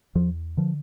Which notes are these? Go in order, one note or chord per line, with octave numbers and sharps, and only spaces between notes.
E2 F3
D3 F3